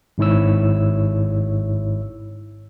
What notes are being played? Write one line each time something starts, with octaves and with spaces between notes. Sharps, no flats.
G#1 G#2 E4 C#5 E6